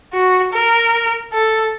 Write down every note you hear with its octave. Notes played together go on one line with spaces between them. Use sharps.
F#4
A#4
A4